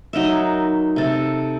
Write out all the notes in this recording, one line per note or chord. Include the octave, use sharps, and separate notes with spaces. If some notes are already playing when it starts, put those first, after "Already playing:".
F#3 D#4 A#4 E5
C3 A4